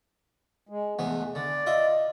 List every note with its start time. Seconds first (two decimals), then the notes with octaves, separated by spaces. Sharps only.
0.69 G#3
0.99 E2 E3 G#3 A3 B3
1.35 D3 D5
1.66 F4 D#5 E5